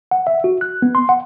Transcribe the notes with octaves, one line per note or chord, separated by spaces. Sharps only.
F#5
E5
F#4
F#6
B3
C6
F#5